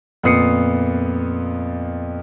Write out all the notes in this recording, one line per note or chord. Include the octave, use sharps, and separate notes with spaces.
F2 A#2 B3 D#6 C7 C#7